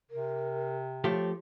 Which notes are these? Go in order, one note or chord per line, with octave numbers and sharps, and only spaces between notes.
C3 A#4
F3 A3 G4 C#5